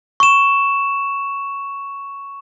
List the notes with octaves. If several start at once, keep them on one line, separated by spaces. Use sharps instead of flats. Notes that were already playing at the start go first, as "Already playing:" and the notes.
C#6 E7